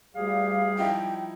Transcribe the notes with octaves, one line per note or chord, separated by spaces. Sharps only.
D2 G3 G#4 F5
F3 D#4 E4 G5